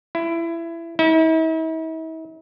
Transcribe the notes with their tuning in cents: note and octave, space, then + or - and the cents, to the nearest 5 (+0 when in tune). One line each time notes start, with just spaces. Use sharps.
E4 +20
E4 -45